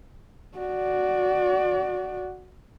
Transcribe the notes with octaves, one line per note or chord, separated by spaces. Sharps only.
F#4 D5